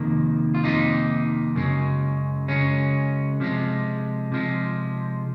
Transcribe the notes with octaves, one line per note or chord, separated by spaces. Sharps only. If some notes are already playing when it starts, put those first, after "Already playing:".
Already playing: F2 C3 D#3 A#3
F4
F2 C3 D#3 A#3 D#4
F#2 C#3 G#3
F#2 C#3 G#3 C#4
C3 F3 G#3
C3 F3 G#3